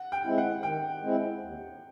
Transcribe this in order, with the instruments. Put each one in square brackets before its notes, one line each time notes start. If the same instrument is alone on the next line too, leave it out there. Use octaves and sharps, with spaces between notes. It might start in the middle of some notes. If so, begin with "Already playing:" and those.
Already playing: [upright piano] F#5
G5
[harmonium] G#3 C4 E4
[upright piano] F#5
[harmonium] D#3 [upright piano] G5
[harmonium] G#3 C4 E4
D#2